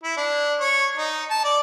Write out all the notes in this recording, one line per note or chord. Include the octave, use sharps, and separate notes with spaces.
E4
D4
C#5
D#4
A5
D5